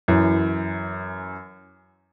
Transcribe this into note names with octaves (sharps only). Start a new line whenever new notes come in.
F#2 E3